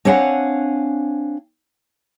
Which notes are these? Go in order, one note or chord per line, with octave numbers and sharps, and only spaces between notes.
C4 D4 C#5 F5 F#5 G#5